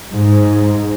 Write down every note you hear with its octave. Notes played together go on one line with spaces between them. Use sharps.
G#2